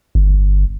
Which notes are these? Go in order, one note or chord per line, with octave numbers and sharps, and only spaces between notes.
G1